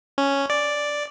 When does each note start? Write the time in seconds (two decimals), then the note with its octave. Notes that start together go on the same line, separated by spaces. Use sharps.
0.18 C#4
0.50 D5